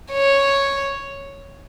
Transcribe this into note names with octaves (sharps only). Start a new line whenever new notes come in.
C#5